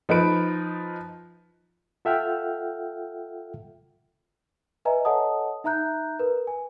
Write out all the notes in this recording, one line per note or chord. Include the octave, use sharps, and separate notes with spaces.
F3 D#4 B4 D7
F4 A4 E5 F#5 G5 F6
B4 D#5 E5 G#5 A#5
A4 C#5 D#5 F#5 A5 D#6
D#4 E5 A#5 F#6 G6
A#4 B4
G#5